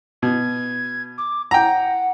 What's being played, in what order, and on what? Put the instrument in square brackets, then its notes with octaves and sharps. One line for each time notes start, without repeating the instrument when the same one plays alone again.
[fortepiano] B2 [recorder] G#6
[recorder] D6
[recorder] F#5 [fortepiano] G5 A#5